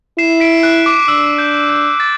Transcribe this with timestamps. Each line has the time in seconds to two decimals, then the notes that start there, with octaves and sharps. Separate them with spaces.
0.18 E4 C7 E7
0.40 B6 D7
0.63 F#6
0.86 D6
1.08 D4 E6
1.38 G6
1.69 G6
2.00 A6